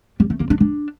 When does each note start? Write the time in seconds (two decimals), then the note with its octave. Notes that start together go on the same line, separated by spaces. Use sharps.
0.20 G3
0.30 A3
0.40 A#3
0.50 D4
0.60 D4